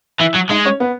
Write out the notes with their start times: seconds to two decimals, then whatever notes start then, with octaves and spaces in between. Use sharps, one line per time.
0.20 E3 E4 E5
0.35 F#3
0.50 G#3 D#4 D#5
0.65 C#4 C#5
0.80 B3 B4